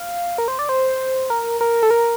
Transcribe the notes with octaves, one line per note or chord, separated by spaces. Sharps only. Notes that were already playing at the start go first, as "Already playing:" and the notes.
Already playing: F5
A#4
C5
D5
C5
A#4
A#4
A4
A#4